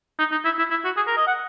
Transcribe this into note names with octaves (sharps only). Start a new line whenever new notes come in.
D#4
D#4
E4
E4
E4
F#4
G#4
A#4
D#5
F#5